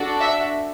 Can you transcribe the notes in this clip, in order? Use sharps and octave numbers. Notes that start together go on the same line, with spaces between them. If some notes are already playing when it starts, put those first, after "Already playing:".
Already playing: D4 F#4 A4
E5